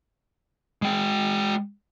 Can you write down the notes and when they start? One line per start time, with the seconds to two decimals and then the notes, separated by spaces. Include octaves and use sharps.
0.82 G#3 G5